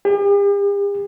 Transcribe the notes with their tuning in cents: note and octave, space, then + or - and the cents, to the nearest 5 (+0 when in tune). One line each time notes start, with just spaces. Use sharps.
G4 +45